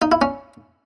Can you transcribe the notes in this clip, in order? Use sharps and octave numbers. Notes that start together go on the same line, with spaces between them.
D#4
E4
C#4